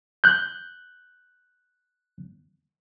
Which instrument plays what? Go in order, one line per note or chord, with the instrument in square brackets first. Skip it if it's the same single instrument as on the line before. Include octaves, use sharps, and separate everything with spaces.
[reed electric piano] F#6 G6